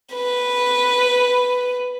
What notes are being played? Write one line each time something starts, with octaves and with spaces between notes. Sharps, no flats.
B4